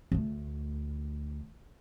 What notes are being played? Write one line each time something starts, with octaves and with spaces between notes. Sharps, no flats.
D2 A3